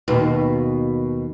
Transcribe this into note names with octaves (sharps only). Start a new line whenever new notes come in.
D#2 B2